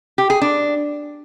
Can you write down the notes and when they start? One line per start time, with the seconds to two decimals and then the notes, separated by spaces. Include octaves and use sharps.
0.18 G4
0.30 G#4
0.42 D4